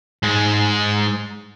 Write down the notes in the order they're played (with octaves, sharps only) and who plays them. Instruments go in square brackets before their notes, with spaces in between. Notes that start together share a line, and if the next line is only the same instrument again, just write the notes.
[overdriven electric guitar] G#2 G#3